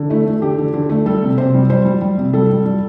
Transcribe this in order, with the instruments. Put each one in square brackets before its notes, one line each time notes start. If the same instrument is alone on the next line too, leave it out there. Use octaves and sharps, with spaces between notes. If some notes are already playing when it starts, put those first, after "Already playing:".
Already playing: [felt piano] D3
A3 E4
A3
D3 G4
D3
D3
A3
G3 A4
C3
C3 C5
G3
G3 C5
G3
G3
C3
G3 A4
G3
G3